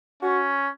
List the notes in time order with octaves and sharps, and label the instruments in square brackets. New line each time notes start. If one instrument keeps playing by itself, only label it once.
[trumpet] C#4 [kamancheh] F#4